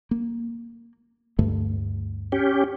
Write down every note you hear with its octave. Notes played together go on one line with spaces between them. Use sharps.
A#3
D2 G2 A3
C#4 G4